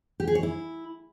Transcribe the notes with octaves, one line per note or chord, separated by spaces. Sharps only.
G4
G#4
C#5
E4